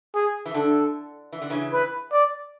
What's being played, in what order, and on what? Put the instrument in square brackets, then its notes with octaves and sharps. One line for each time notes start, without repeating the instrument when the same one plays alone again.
[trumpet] G#4
[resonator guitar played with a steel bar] E3
[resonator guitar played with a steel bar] D3 [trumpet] A4
[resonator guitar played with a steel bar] E3
D3
C#3 E3
[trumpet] B4
D5